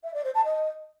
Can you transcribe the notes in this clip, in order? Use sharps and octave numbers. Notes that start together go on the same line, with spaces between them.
E5
D5
C5
A5
D#5